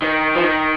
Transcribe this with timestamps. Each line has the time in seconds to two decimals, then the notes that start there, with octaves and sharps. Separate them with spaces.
0.02 D#3
0.35 F3
0.42 D#3